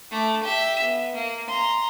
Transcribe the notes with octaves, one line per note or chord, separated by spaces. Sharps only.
A3 D6
G4 E5
B3
A#3
A#5 C6